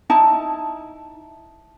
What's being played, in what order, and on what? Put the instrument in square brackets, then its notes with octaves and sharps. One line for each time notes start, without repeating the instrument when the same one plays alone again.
[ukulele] D#4 E4 A5